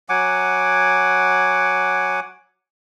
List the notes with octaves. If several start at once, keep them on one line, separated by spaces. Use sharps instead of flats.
F#3 F#5 G#5 D6